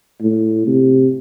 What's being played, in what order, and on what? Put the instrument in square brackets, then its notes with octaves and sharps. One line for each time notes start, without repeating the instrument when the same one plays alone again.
[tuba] A2
C3